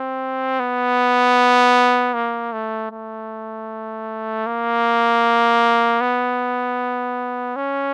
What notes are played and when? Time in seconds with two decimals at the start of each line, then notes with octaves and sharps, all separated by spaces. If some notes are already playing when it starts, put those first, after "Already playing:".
Already playing: C4
0.60 B3
2.14 A#3
2.53 A3
2.91 A3
4.47 A#3
6.01 B3
7.56 C#4